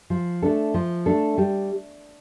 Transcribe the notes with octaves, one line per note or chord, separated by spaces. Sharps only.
F3
A3 D4 A4
F3
A3 D4 A4
G3